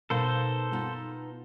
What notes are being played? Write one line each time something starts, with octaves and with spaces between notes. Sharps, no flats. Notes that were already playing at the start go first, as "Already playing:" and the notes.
B2 B3 D#4 A4 C5 F5
B3 D#4 F4